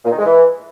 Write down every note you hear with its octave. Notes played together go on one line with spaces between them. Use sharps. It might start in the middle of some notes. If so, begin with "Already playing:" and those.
A#2
D#3
G#3
E3